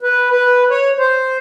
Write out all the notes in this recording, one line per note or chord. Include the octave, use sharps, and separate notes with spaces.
B4
B4
C#5
C5